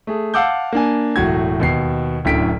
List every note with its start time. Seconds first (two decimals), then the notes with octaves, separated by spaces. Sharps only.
0.07 A3 G#4
0.34 F5 F#5 A5 D6 E6 G6
0.73 A#3 D4 G#5
1.16 E1 A2 F#3 F#4 G#6
1.60 D#2 B2 C7
2.25 D1 F#2 A2 D3 B6 D7